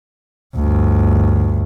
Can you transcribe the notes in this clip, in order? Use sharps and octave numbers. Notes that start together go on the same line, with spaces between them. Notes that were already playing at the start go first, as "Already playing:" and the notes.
G1 D2